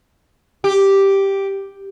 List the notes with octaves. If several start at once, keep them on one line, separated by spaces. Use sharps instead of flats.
G4